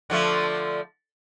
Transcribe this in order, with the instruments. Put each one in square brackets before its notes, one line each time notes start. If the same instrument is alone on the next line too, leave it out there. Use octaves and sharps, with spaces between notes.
[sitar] D3 F3 A3